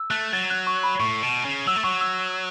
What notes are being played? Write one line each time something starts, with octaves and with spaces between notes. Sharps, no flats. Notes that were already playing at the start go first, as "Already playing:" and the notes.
Already playing: E6
A3 F#6
F#3 A6
F#6
C#6
B5
A2 C#6
B2
C#3
F#3 E6
A3
F#3 C#6
E6